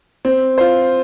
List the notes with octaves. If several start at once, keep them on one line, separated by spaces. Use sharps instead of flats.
C4
F4 C5